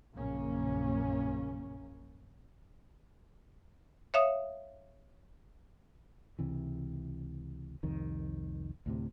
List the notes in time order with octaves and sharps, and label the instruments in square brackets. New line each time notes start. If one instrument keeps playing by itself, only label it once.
[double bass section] A#1 F#2 A#2 C#3 A#3 C#4
[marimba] C#5 E5 F5 D#6
[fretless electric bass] C#2 C3 E3
C2 F2 D#3
D2 A2 C3